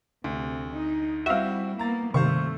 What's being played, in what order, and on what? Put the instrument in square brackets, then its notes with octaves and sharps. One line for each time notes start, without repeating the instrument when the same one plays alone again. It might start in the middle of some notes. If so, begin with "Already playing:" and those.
[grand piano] D2 [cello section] C3
[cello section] D#4
[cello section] G3 E4 [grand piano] C4 F#4 [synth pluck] E5 F5
[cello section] A#3 B3 [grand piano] A#5 A6
[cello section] G2 A3 [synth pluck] C3 D#3 [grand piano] C5 F5 C#6